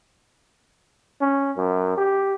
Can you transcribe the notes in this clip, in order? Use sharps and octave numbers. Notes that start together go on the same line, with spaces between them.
C#4
F#2
G4